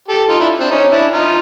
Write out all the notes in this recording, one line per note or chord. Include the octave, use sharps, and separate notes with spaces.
G4 A4
D#4 F4
D4 E4
C4 D4
C#4 D#4
D4 E4
D#4 F4